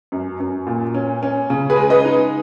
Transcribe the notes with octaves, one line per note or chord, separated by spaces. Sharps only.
F#2
F#2
A#2
C#4
C#4
C#3
G#4 B4
G#3
B4 D#5
D#4